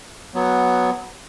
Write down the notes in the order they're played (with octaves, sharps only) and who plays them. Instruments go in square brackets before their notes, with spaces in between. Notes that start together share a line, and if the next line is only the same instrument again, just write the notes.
[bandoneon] F#3 B3